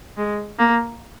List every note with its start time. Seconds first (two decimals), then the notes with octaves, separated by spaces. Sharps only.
0.17 G#3
0.59 A#3